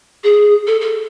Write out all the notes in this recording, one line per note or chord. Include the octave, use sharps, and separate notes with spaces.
G#4
A4
A4